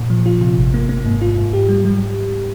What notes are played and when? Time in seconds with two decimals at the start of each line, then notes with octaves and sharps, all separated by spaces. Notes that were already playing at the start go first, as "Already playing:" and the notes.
Already playing: A#2
0.10 F3
0.26 F4
0.41 C3
0.58 G#1
0.74 A#3
0.89 A#3
1.05 G#2
1.22 F4
1.37 G#2
1.53 G4
1.69 G3
1.85 G3